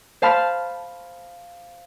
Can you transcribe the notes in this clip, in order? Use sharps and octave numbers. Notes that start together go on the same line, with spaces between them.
C5 F5 A5 B5 F6